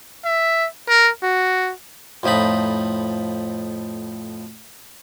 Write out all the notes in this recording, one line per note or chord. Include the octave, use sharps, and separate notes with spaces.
E5
A#4
F#4
F2 A2 F3 D#4 B5